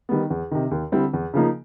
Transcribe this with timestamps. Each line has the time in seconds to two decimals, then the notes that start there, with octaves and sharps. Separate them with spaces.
0.09 D#3 G3 B3
0.30 E2
0.51 C3 D#3
0.71 D#2
0.92 D3 G3 C4 E4
1.13 E2
1.34 C#3 F3 A#3 D#4